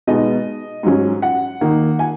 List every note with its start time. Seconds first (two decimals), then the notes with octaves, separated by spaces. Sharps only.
0.07 B2 G#3 B3 D#4 D#5
0.83 G#2 F#3 C#4
1.22 F#5
1.61 D#3 A#3 D#4
1.99 G#5